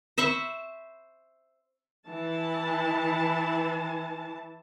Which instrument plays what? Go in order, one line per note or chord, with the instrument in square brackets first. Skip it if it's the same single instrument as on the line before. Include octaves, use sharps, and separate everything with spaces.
[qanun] C5 E5 B5 C#6
[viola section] E3 A5